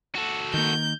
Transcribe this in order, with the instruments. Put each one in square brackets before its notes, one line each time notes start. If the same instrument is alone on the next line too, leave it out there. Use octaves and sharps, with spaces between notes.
[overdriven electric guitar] F#4 A4
[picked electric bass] D#3 A#3 [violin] G6